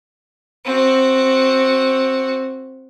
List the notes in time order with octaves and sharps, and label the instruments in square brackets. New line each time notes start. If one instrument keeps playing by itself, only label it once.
[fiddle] C4 F#4